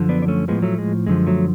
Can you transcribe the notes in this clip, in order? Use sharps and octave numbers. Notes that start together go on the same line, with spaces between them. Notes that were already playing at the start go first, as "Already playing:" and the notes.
Already playing: F#2 D3 F3
B3 D4
D4
A3 C#4
A2 F3 G#3 B3
F#3 A3
G#3
F#2 D3 F3 G#3
F#3 A3